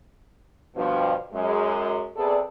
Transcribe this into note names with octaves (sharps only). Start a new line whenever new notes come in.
G2 B2 F3
F#2 G#3
C3 B3 G#4 A4 D5